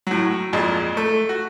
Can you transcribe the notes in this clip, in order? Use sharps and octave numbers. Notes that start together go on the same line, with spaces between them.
A2 F#3
F2 A#2 G#3
A3
F#4